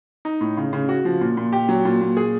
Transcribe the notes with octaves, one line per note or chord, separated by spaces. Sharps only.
D#4
A2
C#3
C#3
F#4
F3
A#2
A#2
G4
F#3
A#2
A#2
G#4